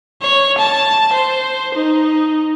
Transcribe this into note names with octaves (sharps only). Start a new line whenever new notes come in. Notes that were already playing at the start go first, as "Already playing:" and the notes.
C#5
A5
C5
D#4